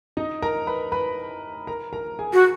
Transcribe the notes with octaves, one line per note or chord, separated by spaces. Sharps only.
D#4 D#5
A#4 A#5
B4 B5
B4 B5
A#4 A#5
A#4 A#5
G#4 G#5
F#4